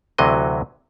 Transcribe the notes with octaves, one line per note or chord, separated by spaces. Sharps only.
D2 C3 E3 F#3 D#5